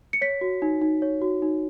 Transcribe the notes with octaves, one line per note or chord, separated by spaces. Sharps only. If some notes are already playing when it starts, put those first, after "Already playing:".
C#7
C#5 B6
F#4
D#4
D#4
C#5
F#4
D#4